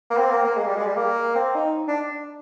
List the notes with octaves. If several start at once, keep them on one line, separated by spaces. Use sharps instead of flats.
A#3
C4
A#3
A#3
G#3
G3
G#3
G3
A#3
C4
D#4
D4